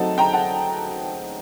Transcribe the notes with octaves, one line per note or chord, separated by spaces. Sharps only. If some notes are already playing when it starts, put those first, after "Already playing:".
Already playing: F#3 A3 C4 D#4 F#5 A5
G5 A#5
F#5 A5